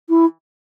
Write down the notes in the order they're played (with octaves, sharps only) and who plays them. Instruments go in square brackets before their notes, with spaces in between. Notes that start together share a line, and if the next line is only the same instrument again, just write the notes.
[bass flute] E4